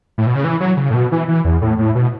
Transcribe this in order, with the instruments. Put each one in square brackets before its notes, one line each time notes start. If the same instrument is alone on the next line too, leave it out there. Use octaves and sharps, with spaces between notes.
[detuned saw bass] A2
B2
C#3
E3
F#3
C#3
A2
B2
E3
E3
E2
A2
A2
B2